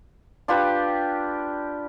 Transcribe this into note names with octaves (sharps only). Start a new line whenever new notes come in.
D4 F4 G4 B4